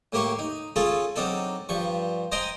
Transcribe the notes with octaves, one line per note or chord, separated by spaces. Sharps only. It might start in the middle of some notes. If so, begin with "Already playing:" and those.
A2 A#3 G4 C6 C#6
D#4
C#4 F4 G#4 A4
F#3 C4 D4 D#4 A4
G2 F3 C#6
C5 D#5 G5 G#5 A#5 C6